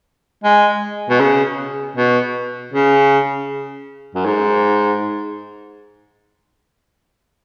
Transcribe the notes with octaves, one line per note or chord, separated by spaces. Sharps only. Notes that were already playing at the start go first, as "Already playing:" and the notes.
G#3
B2
C#3
B2
C#3
F#2
G#2